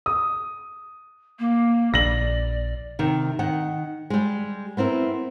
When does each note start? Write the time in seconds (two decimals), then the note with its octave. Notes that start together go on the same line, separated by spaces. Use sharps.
0.06 D#6
1.39 A#3
1.94 A#1 D5 A#6 F#7
2.99 C3 D#3
3.39 D#3 F#5
4.10 G3 G#3
4.77 B3 C4 E4 A#4